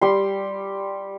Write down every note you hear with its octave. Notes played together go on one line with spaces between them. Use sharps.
G3 C6